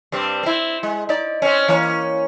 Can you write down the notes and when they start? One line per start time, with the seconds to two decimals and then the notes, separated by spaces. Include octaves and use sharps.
0.12 G2 G3 C4
0.43 C4 E4
0.83 G#3
1.09 D#4 D5
1.42 C4 C#4
1.68 E3 A#3 C#4